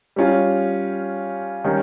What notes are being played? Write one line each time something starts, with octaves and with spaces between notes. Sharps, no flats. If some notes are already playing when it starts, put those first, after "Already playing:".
G3 C#4 F4
D#3 G3 C#4